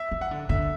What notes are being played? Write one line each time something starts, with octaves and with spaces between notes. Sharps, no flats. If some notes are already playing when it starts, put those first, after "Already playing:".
Already playing: E5
E3
F#5
D3
D3 E5